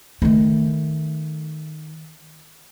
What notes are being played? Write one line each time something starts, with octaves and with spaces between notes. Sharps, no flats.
D#3 A3